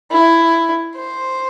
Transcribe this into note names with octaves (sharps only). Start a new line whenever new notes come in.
E4
C5